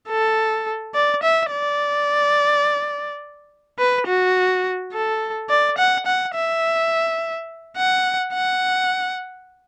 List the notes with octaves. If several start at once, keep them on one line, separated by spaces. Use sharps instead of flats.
A4
D5
E5
D5
B4
F#4
A4
D5
F#5
F#5
E5
F#5
F#5